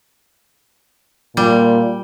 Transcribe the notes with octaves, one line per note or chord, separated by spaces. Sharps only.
A#2 G3